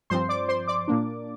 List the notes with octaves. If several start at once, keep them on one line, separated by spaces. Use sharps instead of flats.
G2 F3 C4 C5 C6
D5 D6
C5 C6
D5 D6
A#2 A#3 D4